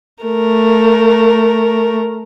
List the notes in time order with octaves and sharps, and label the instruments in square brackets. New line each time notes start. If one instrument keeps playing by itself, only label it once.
[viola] A3 A#4